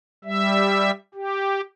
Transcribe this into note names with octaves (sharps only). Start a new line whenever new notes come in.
G3 E5
G4